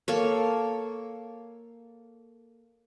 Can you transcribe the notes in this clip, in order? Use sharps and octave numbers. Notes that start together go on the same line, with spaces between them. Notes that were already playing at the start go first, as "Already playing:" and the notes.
A#3 A4 C#5